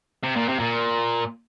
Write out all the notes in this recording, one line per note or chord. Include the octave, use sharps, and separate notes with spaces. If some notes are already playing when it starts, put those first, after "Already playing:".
C3
A#2
C3
A#2